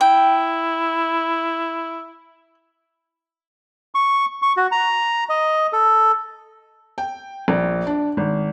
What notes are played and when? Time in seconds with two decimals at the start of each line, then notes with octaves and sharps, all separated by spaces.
0.01 E4 G5
3.95 C#6
4.42 C#6
4.57 F#4
4.72 A#5
5.29 D#5
5.73 A4
6.98 G5
7.48 A#1
7.87 D4
8.17 G#1